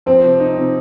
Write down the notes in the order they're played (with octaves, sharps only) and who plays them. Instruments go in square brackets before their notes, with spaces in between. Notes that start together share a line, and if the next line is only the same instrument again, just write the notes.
[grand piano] F3 [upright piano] C4
[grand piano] C3
D#4
C3